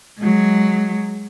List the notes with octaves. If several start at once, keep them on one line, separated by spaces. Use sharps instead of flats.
F#3 G#3